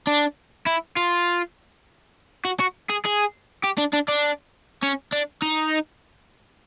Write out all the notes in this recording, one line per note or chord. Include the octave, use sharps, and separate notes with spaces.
D4
E4
F4
F#4
F#4
G#4
G#4
G4
D4
D4
D4
C#4
D4
D#4